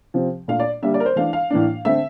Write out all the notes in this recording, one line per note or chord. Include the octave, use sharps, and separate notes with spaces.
C3 F3 C4
A#2 A3 D4 F5
D5
D3 G3 A#3 D4 E5
D5
A#4
C5
E3 A3 D4 F5
F5
A2 E3 A#3 D4
D3 A3 C4 E5